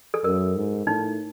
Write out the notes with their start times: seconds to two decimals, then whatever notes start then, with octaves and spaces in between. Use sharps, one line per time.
0.14 A4
0.24 F#2 A#4
0.56 G#2
0.87 A2 D#4